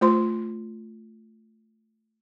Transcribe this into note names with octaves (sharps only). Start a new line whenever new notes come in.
A3 F4 C5 C6